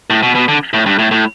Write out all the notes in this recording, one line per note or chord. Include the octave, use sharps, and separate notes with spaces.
A2
B2
B2
D3
A2
G2
A2
A2